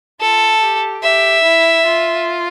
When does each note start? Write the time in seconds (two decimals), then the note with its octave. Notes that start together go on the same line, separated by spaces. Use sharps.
0.21 F4 A4
0.62 G4
1.03 G4 E5
1.44 E4
1.85 F4